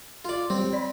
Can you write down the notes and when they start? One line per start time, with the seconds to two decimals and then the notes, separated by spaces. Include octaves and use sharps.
0.25 F4 D5
0.50 G3 C4 C#5
0.73 D5 B5